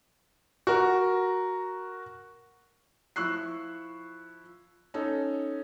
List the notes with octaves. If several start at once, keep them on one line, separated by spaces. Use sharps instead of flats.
F#4 A#4
F3 E4 C#6 E6 F#6 C7
C#4 D#4 A4